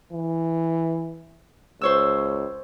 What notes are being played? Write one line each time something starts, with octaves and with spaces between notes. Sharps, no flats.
E3
C#2 C5 C#5 E6